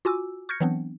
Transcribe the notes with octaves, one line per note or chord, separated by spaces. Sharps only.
F4 F#4 G#5 D6 E6
C#6 F6 G6 G#6 A#6 C#7
E3 F#3 B3 C4 D4